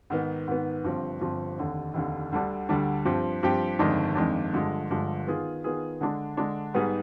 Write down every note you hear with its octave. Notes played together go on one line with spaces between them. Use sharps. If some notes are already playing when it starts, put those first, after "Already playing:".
G#2 D#3 B3
G#2 D#3 B3
G1 G2 F3 C4
G1 G2 F3 C4
F1 D#2 D3
F1 D#2 D3
D2 D3 G3 D4
D2 D3 G3 D4
G2 F3 C4 G4
G2 F3 C4 G4
G1 F2 D#3 G#3 D4
G1 F2 D#3 G#3 D4
G1 G2 D3 F3 G#3
G1 G2 D3 F3 G#3
D#3 B3 F4 G#4
D#3 B3 F4 G#4
D3 G#3 D4
D3 G#3 D4
G#2 G3 B3 D#4 G#4